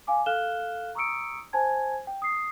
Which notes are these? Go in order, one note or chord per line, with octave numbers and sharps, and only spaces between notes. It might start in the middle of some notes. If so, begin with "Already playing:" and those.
F5 G#5 D6
A4 F5 F6 F#6 E7 G7
A#5 C#6 D#6 E6 C#7 D7
C5 G#5 A5 G#6
G5
D#6 C7